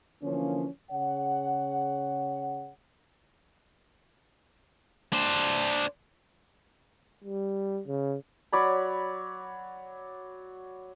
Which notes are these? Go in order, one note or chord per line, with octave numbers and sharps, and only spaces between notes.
D3 E3 F3 A#3 C#4
C#3 G#4 C#5 F#5
D4 C5
G3
C#3
F#3 D5 B5